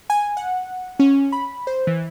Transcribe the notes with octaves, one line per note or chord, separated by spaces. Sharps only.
G#5
F#5
C#4
B5
C5
E3